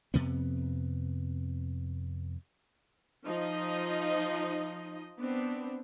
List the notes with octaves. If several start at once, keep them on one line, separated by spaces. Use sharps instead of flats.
F2 C3 B3
F3 D#4 D#5
B3 C4 D4